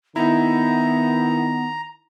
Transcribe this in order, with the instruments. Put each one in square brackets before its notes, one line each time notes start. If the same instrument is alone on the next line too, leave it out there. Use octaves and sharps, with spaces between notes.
[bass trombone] D#3 [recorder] B3 [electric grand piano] D#4 E4 [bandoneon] A#5